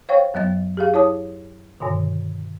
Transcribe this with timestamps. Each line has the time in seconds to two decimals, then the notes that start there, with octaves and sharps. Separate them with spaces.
0.09 C5 C#5 F5 G5 C#6
0.34 F#2 F#3 B3 D#5 A6
0.77 G4 G#4 F5
0.94 E4 C#5 A5 D#6
1.80 G2 B2 D3 D#3